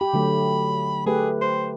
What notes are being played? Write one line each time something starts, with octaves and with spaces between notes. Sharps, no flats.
G4 B5
D3 F#3 A3
A3 G4 G#4 B4
C5